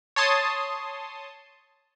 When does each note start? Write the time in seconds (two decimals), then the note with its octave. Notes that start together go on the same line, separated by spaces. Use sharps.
0.16 C#5 A5 C6 D#6